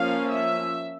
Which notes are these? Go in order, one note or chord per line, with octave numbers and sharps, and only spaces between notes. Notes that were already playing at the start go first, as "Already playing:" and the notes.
Already playing: F3 A#3 C#4 F5
E5